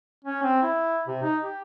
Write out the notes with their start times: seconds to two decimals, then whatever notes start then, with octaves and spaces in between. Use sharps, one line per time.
0.25 C#4
0.43 C4
0.63 E4
1.07 C3
1.22 D#4
1.42 G4